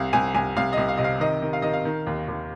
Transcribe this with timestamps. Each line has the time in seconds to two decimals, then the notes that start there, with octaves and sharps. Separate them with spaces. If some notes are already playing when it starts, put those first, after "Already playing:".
Already playing: C2 F5
0.13 C2 G#5
0.34 C2 G#5
0.57 C2 F5
0.73 C2 D#5
0.88 F5
0.97 C3 D#5
1.04 F5
1.20 D#3 D#5
1.42 D#3
1.53 F5
1.62 D#3 D#5
1.73 F5
1.85 D#3
2.07 D#2
2.28 D#2